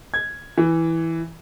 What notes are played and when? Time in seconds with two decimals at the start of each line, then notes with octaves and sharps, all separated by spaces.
0.14 G#6
0.58 E3